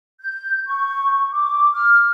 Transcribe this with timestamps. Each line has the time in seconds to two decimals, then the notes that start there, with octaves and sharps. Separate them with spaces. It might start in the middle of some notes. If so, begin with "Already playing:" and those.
0.21 G6
0.67 C#6
1.33 D6
1.73 F6